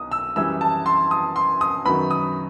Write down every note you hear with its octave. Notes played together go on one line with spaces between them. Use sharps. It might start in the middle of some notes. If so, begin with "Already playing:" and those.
Already playing: B1 D#6
E6
F#2 E3 G3 E6
A5
C6
D#6
C6
D#6
F#2 D#3 F#3 B3 B5
D#6